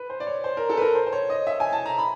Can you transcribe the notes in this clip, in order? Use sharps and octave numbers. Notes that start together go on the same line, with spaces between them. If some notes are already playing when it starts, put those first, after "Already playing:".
Already playing: B4
C5
D5
C#5
C5
A#4
A4
B4
A#4
C5
C5
C#5
D#5
E5
G#5
A5
A#5
B5